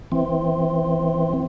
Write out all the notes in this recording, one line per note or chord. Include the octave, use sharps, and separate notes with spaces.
E3 C4